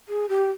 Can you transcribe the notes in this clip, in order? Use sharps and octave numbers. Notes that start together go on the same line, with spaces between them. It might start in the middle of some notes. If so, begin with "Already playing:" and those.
G#4
G4